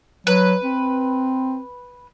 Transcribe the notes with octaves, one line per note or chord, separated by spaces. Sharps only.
F#3 B4
C4